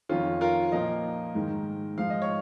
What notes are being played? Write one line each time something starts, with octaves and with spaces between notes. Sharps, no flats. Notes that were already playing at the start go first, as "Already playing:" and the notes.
F2 D#3 C#4 F4
F4 A#4
A#2 F3 A#4 D#5
G#2 D#3
G#2 F3 F5
D#5
C#5